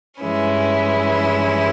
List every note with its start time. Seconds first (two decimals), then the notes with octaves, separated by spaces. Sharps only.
0.21 G2 E3 G#3 C#4 E4